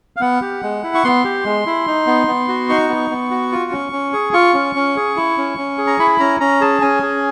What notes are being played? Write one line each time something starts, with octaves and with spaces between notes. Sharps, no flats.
F5
B3 F#5
G4
G#3
E4
C#6
B3 C6
G4
G#3
E4
D#4
B3
B3
F#4
D#4 C#6
B3
B3
F#4
F4
C#4
C#4
G#4
F4 C#6
C#4
C#4
G#4
E4
C#4
C#4
G#4
A#5
E4 B5
C#4 A#5
C#4 A#5
G#4 A5
C#4 G#5
G#4